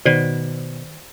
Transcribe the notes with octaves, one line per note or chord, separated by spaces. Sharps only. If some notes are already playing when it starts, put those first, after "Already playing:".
B2 D#3 C5 D5